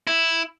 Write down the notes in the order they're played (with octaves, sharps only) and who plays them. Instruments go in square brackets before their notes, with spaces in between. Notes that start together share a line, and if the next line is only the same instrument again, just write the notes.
[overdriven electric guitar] E4